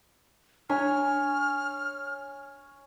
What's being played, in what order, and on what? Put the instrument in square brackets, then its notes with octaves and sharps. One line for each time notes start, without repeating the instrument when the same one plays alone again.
[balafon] D4 [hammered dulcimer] C#5 G#5 [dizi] F6